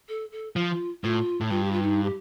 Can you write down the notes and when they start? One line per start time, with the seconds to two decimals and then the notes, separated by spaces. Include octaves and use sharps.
0.09 A4
0.32 A4
0.56 F3 F4
1.04 A2 F4
1.41 A2
1.50 G2 F4
1.63 G4
1.72 F4
1.82 D#4
2.03 G4